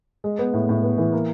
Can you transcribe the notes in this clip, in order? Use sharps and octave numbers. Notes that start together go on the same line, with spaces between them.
G#3
B3
A2
A2
B3
E3
A#3